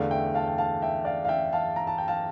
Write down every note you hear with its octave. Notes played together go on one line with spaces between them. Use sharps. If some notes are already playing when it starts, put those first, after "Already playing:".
Already playing: E2 D3 A3 D5 F5
E5 G5
F5 A5
G5
F5 A5
E5 G5
D5 F5
F5
E5 G5
F5 A5
A#5
A5
G5
F5 A5